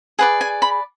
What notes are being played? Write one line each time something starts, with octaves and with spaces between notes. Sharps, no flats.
G#4 B4 D5 F#5
G#5
B5